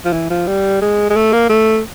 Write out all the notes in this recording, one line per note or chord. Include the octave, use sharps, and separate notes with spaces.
F3
E3
F3
G3
G#3
G#3
A3
A#3
A3